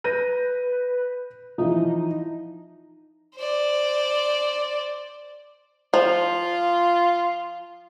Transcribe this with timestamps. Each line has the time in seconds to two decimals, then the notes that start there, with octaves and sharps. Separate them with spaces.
0.04 B4 G6 A#6 D#7
1.58 E3 F3 D#4
3.36 C5 D5
5.94 F3 F4